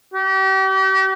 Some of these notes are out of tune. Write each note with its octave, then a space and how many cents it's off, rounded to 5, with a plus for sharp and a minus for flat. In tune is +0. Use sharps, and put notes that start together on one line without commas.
G4 -40